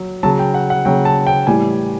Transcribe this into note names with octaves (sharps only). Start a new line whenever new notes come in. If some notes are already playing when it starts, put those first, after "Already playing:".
Already playing: F#3
C#3 F#3 A5
G5
F#5
F#5
C#3 F#3 G5
A5
G5
A2 E3 G3 G#5